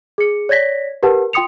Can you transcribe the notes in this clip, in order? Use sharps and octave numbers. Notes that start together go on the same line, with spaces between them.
G#4 C#7
C#5 D5 G#6 A#6 B6
G4 A#4 B4 F#5 A5
F4 G5 C6 D#6 C#7 F7